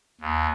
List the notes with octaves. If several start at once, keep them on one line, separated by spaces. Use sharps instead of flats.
D#2